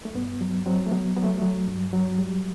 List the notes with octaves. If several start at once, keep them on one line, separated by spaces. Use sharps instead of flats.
A3
G2 B3
F#3
F#3 C4
A3
F#3 B3
F#3 B3
A3
F#3 A3
G2
F#3
G3